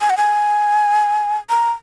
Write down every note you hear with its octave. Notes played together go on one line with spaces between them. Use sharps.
G#5
F#5
G#5
A#5